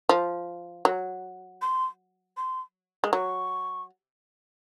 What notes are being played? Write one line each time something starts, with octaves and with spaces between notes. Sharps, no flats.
F3
F#3
C6
C6
G#3
F#3 C#6